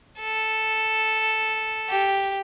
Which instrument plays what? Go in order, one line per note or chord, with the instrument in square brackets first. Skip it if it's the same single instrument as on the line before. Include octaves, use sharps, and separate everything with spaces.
[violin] A4
G4